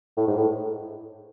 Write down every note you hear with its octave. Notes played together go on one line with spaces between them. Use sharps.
A2
G#2
A2